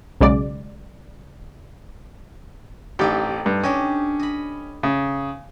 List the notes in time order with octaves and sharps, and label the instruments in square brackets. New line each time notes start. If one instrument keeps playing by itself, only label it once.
[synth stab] B1 C#3 F#3 G#3 D5
[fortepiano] A1 G4 [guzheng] C4 D#4 A4
[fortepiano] G2
[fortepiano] C#4 [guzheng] D4 G4 D#5
[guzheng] D#5 B5
[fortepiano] C#3